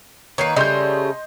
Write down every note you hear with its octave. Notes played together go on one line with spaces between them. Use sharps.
D#3 A#3 B4 C#5 C7
C#3 G3 A3 D#5 C6 G6